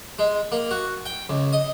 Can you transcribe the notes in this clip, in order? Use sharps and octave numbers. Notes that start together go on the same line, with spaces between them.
G#3
A#3
F#4
G5
C#2
D#5